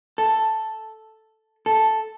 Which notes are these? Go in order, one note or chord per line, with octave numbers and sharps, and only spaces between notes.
A4
A4